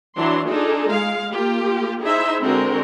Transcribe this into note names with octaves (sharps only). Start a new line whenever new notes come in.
E3 F#3 D4 C6
D4 D#4 F4 G#4 A4
G#3 F5
A#3 F4 G4
D#4 E4 G#4 C5 E5
D3 G#3 C4 D4 F#4 A#4